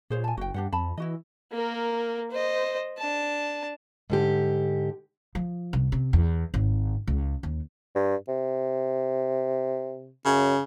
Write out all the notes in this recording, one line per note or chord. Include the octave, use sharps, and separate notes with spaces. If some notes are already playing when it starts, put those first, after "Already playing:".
A#2 G#4 C5 C#5
G#5 A5
F#1 F#4 G5
G2 D4 G4 F#5
F2 A5 B5
E3 E4 F#4 D#5
A#3 A#4
C5 D#5
D4 A5
G#2 D3 G4
F3
C2
C3
E2
G#1
C#2
D#2
G2
C3
F#2 C#3